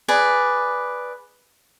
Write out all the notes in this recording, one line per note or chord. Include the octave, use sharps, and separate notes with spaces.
G#4 B4 D5